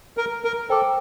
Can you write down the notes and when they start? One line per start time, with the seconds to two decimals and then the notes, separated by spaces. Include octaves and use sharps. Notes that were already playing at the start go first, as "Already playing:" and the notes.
0.17 A#4
0.44 A#4
0.70 A4 C5 G5 D6